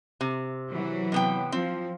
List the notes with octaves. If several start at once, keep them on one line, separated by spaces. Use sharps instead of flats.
C3
E3 F#3
C3 B3 G5
F3 C4